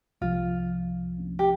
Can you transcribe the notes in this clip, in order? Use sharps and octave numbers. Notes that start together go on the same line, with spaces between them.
C2 C3 F3 F4
G4